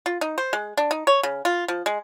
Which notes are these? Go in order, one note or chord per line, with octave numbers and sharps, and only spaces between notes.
F4
D#4
C5
G#3
D4
D#4
C#5
C#3
F4
F3
G#3